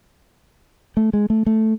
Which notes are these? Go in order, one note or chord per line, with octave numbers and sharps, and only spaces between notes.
A3
G#3
A3
A3